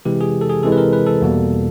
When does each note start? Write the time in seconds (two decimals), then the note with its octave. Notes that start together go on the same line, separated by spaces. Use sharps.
0.05 C3 E3 G#3 G4
0.21 G#4
0.41 A4
0.49 G#4
0.63 C3 E3 G#3 A4
0.72 B4
0.78 A#4
0.93 B4
1.06 A4
1.22 E2 B2 G3 A#3